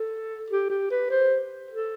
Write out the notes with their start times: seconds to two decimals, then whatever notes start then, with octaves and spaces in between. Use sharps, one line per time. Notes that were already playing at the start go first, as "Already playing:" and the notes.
Already playing: A4
0.50 G4
0.70 G4
0.91 B4
1.10 C5
1.71 A4